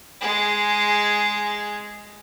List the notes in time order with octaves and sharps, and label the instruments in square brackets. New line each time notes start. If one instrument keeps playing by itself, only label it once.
[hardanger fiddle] G#3 G#4